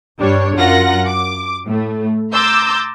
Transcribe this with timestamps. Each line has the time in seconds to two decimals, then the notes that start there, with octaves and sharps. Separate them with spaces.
0.18 G2 G3 D4 C#5
0.55 F#2 F4 A#4 F#5 A#6
1.06 D6
1.65 A2 A3
2.33 A#5 C6 D6 E6 G6 A6